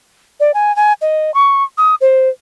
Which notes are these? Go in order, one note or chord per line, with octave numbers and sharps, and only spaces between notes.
D5
G#5
G#5
D#5
C#6
D#6
C5